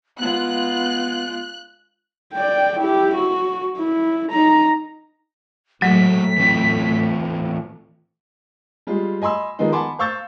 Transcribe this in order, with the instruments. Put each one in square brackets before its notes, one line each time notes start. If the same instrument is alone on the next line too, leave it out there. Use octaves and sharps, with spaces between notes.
[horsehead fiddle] G#3 F4 [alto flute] B3 [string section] F#6
[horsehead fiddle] D5 G5
E4 G4
F#4
E4
D#4 A#5
[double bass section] A2 A3 [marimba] F#3 [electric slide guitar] G#3 F#4 [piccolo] B6
[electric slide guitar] E3 C4 F4
[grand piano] G3 G#3 F4
D#5 G#5 B5 C6 E6
D#3 F3 G#3 B3 D#4
F#5 G#5 A5 B5 C6 D6
C5 F5 C#6 E6 G6 A6